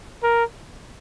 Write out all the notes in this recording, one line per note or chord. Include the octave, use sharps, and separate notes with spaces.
A#4